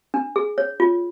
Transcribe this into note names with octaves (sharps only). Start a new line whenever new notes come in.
D4
G#4
C#5
F4